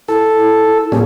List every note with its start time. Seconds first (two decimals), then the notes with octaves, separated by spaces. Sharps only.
0.08 E4 A4
0.92 A#2 G3 C#4 G#4